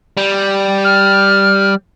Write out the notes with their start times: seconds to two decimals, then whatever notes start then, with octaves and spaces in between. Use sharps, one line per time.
0.17 G3
0.85 F6